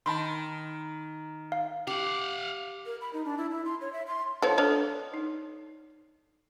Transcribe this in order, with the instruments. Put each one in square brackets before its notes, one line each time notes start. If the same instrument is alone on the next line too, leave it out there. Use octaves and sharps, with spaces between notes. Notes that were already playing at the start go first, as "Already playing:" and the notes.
[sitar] D#3 [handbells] A5 B5 C6
[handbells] F5
[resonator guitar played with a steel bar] G4 [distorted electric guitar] F5 F#5
[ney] A#4
B5
D#4
D4
E4
E4
C6
C#5
E5
C6
[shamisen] F3 B3 A4 [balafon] C#5 F#5
[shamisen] D4 D#5 [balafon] A4 C#5
[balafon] D#4